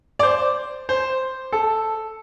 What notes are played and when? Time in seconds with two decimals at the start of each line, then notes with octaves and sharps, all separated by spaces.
0.19 D5
0.23 C5
0.89 C5
1.52 A4